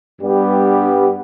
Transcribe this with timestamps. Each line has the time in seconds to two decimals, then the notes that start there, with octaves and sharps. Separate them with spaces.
0.20 G2 G3 B3 G4